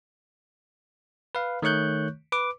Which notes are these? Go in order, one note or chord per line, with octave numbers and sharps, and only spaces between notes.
B4 F5
D#3 A3 C#5 C#6 F#6 G6
B4 D6